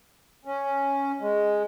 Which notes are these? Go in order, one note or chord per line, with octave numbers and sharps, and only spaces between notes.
C#4
G#3